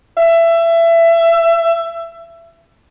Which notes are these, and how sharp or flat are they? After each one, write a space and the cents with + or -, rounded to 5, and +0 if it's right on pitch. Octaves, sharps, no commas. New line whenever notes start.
E5 +25